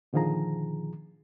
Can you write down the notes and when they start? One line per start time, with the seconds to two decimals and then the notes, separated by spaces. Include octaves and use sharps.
0.13 A#2 D3 D#3 F3 G#4 A#5